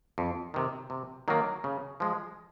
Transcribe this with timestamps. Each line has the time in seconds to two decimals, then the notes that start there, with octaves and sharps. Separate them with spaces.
0.18 F2
0.54 C3 D#3
0.90 C3
1.28 D#3 F#3 A#3
1.64 C#3
2.00 F3 G#3